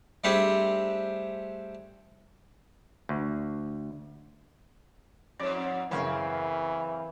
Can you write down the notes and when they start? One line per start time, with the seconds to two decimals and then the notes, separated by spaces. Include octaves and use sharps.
0.24 G3 A3 C4 D4 G4 G#4
3.09 D2
5.39 F2 G#2 D5
5.91 F#2 C#3 E3 C4